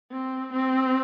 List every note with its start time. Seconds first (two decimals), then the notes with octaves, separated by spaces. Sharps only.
0.12 C4
0.54 C4